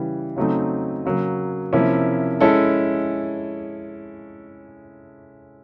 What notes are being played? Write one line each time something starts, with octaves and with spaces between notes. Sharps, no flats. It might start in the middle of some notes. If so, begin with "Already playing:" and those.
Already playing: C#3 E3 G3
C#3 F#3 A3 C4 D#4
C#3 F#3 A#3
C3 F3 A#3 C#4 E4
G#3 C#4 E4 A4